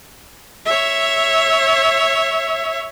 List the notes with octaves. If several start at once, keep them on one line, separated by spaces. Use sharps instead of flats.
C#5 E5